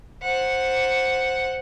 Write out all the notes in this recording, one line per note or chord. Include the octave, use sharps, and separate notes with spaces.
C5 F#5